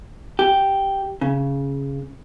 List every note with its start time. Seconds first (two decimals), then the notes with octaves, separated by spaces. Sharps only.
0.39 G4
1.21 C#3